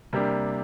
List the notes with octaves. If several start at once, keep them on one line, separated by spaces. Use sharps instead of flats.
C3 G3 A#3 D4